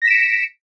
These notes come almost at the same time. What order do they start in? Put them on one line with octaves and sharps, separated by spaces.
A#6 B6 E7 D7 C#7